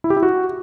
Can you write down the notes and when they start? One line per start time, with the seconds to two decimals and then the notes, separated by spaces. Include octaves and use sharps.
0.04 E4
0.10 G4
0.16 E4
0.23 F#4